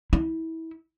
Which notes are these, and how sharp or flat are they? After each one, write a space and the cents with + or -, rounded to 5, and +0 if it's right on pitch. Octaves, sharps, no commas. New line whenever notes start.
E4 -25